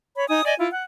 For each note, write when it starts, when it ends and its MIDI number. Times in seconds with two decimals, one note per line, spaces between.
0.16 0.28 73
0.16 0.28 83
0.29 0.44 63
0.29 0.44 80
0.29 0.44 87
0.46 0.54 74
0.46 0.54 75
0.46 0.54 80
0.59 0.68 64
0.59 0.68 65
0.72 0.85 78